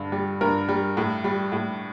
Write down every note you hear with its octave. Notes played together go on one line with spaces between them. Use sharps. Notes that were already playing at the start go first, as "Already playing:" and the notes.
Already playing: G2 D3
G3
G2 A#4
G3
A2
G3
A2